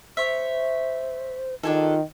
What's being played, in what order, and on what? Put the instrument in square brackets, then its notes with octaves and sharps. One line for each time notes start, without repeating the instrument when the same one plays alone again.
[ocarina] C5 [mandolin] C#5 E5
[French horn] D#3 [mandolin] D4 G#4 A4 [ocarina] F4